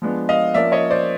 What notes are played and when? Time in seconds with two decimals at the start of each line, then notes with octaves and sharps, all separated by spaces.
0.02 F3 G#3 B3 D4
0.29 D#5 F5
0.54 F3 A#3 C#4 D5 E5
0.72 C#5 D#5
0.90 C5 D5